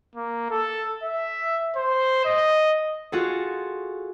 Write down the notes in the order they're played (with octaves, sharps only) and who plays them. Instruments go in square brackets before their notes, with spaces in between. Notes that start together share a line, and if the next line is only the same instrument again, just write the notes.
[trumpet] A#3
A4
E5
C5
D#5
[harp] F4 F#4 G#4 A4